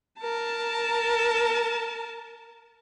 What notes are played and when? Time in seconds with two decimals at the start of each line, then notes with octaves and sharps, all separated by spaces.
0.20 A#4 A5